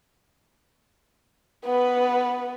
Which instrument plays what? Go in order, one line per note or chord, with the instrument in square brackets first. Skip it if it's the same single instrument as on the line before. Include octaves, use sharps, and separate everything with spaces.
[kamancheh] B3 B4